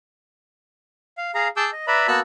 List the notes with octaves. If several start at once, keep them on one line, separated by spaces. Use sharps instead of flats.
F5
G#4 F5 A#5
G#4 A5 D6 E6 G6
D#5
B4 D5 E5 A#5 B5
A#3 B3 F#4 A5 E6 F#6